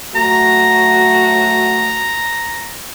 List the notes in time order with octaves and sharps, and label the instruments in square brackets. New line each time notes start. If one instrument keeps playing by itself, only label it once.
[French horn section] F#3 A3 F#4 [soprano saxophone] A#5